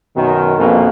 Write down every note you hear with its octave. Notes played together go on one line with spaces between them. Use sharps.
F#2 B2 D#3
A#1 F2 B2 A#3